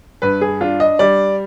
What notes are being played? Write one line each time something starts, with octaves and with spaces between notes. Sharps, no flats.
G2 B4
G#4
D4 F4
D#5
G3 D5